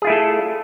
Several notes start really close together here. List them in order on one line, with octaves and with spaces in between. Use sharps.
G#4 F4 E4 A3 A4